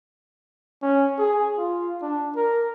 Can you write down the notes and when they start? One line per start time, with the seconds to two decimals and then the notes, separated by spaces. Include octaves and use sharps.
0.82 C#4
1.18 G#4
1.58 F4
2.02 D4
2.36 A#4